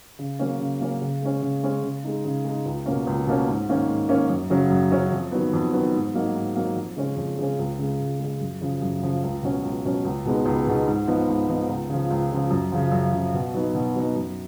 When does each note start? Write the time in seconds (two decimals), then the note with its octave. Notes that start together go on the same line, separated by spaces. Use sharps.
0.19 C#3
0.39 F#3 A#3 C#4
0.60 C#3
0.80 F#3 A#3 C#4
1.01 C#3
1.22 G#3 C#4
1.42 C#3
1.63 G#3 C#4
1.83 C#3
2.04 G#3 D#4
2.25 C#3
2.45 G#3 D#4
2.65 C#2
2.86 B2 A#3 C#4
3.07 C#2
3.27 B2 A#3 C#4
3.48 G#2
3.69 D#3 A#3 C#4
3.88 G#2
4.09 D#3 A#3 C#4
4.29 F#2
4.50 C#3 F#3 C#4
4.70 F#2
4.91 C#3 F#3 C#4
5.12 F2
5.32 D#3 F#3 B3
5.53 F2
5.73 D#3 F#3 B3
5.94 G#2
6.14 F#3 A#3 D#4
6.35 G#2
6.56 F#3 A#3 D#4
6.76 F2
6.96 C#3 G#3 C#4
7.17 F2
7.38 C#3 G#3 C#4
7.59 C#2
7.79 C#3 G#3
8.00 C#2
8.19 C#3 G#3
8.40 F#2
8.61 C#3 F3
8.82 F#2
9.02 C#3 F3
9.23 C#2
9.43 B2 F#3 C#4
9.63 C#2
9.85 B2 F#3 C#4
10.05 C#2
10.25 B2 G#3 B3 D#4
10.45 C#2
10.67 B2 G#3 B3 D#4
10.87 G#2
11.07 F3 B3 D#4
11.28 G#2
11.48 F3 B3 D#4
11.69 C#2
11.89 C#3 F3
12.10 C#2
12.31 C#3 F3
12.51 F#2
12.72 C#3 F3
12.92 F#2
13.12 C#3 F3
13.34 B2
13.54 F#3 B3 D#4
13.75 B2
13.95 F#3 B3 D#4
14.16 F#2